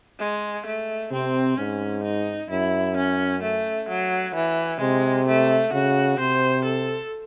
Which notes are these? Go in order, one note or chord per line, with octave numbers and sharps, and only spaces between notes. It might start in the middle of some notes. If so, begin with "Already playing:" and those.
G#3
A3
C3 C4
G#2 C#4
D#4
F#2 E4
C#4
A3
F#3
E3
C3 G#3
A3
C#3 F#4
C3 C5
A4